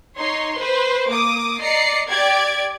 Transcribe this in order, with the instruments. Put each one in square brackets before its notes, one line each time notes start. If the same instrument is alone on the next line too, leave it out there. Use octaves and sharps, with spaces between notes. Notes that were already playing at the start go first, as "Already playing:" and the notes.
[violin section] D#4 C#5 C6
B4 C5
A#3 D6 D#6
D5 D#5 A#5 C7 C#7
G4 D5 G#6 D7